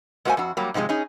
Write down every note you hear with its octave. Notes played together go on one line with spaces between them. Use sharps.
G#3 A#3 F#4 B4 C5 G#5
F2 F#4
F#3 G3 A#3
G#2 C3 F3 G3 G#3
C#4 D#4 G#4